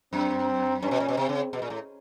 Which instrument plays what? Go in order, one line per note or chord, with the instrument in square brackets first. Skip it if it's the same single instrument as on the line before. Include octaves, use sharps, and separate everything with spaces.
[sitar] F#2 [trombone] C4
[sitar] G2 [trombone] C#4
[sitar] B2
A#2
B2
[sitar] C3 [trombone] C4
[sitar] C#3
B2
A#2
A2